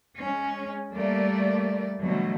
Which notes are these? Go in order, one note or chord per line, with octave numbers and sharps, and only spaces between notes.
G#3 C#4
G3 A3 A#3 D5
B2 D3 E3 F#3 G3 A3